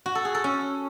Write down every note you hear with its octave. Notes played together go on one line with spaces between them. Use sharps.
F#4
A4
G#4
A4
C#4